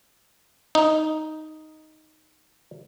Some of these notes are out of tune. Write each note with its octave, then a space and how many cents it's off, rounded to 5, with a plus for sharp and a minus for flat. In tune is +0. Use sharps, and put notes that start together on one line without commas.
D#4 +0